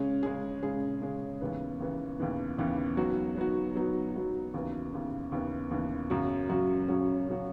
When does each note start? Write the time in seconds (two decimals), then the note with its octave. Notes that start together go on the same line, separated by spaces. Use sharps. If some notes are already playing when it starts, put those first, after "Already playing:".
Already playing: C#3 G#3 C#4 G#4
0.23 C#3 G#3 C#4 G#4
0.63 C#3 G#3 C#4 G#4
1.01 C#3 G#3 C#4 G#4
1.41 D#2 C#3 E3 B3
1.80 D#2 C#3 E3 B3
2.19 D#2 C#3 E3 B3
2.58 D#2 C#3 E3 B3
2.97 F#3 B3 D#4 F#4
3.36 F#3 B3 D#4 F#4
3.75 F#3 B3 D#4 F#4
4.14 F#3 B3 D#4 F#4
4.54 D#2 C#3 E3 B3
4.93 D#2 C#3 E3 B3
5.32 D#2 C#3 E3 B3
5.71 D#2 C#3 E3 B3
6.10 F#2 C#3 F#3 C#4 F#4
6.49 F#2 C#3 F#3 C#4 F#4
6.88 F#2 C#3 F#3 C#4 F#4
7.28 C#3 F#3 C#4 F#4